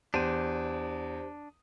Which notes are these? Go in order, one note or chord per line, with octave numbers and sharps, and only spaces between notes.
E2 D4 G4 C5 D#7